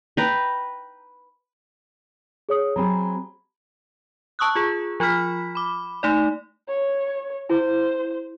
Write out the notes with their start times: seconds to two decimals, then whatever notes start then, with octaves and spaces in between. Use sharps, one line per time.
0.17 B4 G5 A#5
2.49 G#4 C#5 D#6
2.76 F#3 C4 G#4 A#5 B5
4.39 A5 C#6 D#6 E6 F#6
4.56 F4 G#4
5.00 F3 F4 B5 F6 B6
5.55 B5 D6
6.03 A3 D#4 D5
6.68 C#5
7.50 E4 G#4 C5